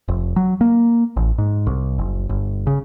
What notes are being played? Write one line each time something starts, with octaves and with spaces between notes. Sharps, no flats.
F1
F#3
A#3
A1
G#2
C2
F#1
G1
C#3